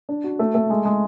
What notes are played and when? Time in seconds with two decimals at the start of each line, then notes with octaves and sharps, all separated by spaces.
0.09 D4
0.24 F#4
0.39 A3
0.55 A3
0.70 G#3
0.85 G#3